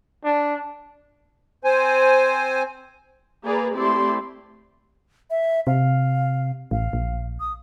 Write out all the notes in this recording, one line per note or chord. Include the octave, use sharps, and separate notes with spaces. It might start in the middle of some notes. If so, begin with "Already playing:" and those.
D4
C4 C5 G#5
A#3 G#4 B4 D5 A#5
A3 C4 E4 G4 D5 C6
E5
C3 F5
A1 F5
A#1
D#6